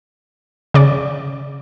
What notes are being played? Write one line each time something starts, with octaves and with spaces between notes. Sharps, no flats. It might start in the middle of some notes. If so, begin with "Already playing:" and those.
C#3 D5